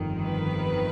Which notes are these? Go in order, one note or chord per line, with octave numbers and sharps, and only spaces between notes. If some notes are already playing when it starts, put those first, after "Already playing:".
Already playing: G1 F2 D#3
B4